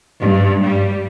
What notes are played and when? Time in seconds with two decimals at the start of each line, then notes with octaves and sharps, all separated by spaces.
0.21 G2
0.62 G3